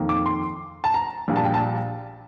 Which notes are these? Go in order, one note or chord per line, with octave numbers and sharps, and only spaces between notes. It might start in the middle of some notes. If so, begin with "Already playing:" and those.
Already playing: F2 D#3 A#3
D6
C6
A5
A#5
A#1 A#2 G3
A5
G5
A5